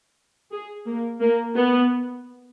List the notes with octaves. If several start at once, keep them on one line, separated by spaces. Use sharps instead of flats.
G#4
A#3
A#3
B3